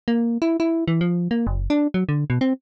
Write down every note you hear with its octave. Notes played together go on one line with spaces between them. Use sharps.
A#3
E4
E4
E3
F3
A#3
F#1
D4
F#3
D3
B2
C4